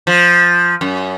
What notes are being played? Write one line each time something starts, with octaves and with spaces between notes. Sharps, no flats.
F3
F#2